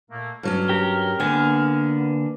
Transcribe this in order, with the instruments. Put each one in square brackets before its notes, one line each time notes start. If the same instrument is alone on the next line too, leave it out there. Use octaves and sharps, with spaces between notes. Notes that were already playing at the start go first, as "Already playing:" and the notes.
[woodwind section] A#2 A3 A#3
[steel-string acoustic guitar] G2 F#3 C#4 [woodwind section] F6
[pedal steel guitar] G4 A#4
[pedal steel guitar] D3 A#3 G#5 [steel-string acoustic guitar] B3